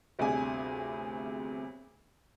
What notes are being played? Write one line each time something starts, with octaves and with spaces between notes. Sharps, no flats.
G1 D2 C3 D4 G#4 G#5